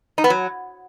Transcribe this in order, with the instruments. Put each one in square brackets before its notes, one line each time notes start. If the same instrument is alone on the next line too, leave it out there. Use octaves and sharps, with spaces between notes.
[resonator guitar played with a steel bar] D#4
B3
F#3